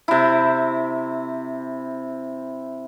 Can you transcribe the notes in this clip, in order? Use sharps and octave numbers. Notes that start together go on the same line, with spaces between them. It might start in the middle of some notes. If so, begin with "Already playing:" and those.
C3 E4